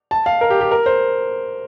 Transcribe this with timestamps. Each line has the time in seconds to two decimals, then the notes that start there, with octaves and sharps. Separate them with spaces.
0.11 A5
0.26 F5
0.41 A#4
0.50 G4
0.61 G4
0.71 A#4
0.86 C5